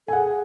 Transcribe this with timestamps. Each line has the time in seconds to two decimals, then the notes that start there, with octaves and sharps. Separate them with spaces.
0.07 A4 G#5
0.13 G#4 F#5